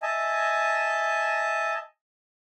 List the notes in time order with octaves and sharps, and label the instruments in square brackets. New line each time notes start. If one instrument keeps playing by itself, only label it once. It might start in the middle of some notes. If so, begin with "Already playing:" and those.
[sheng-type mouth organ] D#5 E5 G#5 A5